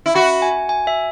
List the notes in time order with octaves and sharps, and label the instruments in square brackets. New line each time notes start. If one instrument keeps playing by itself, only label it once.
[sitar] E4
[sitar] F#4 [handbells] B5
[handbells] G#5
G#5
E5